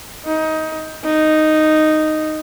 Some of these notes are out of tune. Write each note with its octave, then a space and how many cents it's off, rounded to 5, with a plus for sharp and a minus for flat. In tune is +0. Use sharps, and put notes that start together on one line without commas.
D#4 +20
D#4 -5